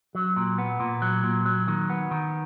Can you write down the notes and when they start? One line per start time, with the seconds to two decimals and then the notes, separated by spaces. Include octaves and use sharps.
0.15 F#3
0.37 A#2
0.58 B3
0.80 A#2
1.02 F#3
1.24 A#2
1.46 F#3
1.68 D#3
1.90 B3
2.11 D#3